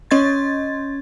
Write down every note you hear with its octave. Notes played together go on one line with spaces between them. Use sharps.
C#4 D#5 C6 G#6 A6